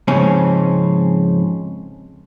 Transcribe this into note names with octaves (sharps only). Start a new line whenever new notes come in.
F2 G#2 C#3 C4 C#4